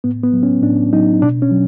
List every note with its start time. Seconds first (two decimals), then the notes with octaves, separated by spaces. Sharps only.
0.04 A2 B3
0.23 B3
0.33 F#3
0.43 C#4
0.63 A2 D4
0.93 F#3 D#4
1.22 B2 D4
1.42 C#4
1.52 F#3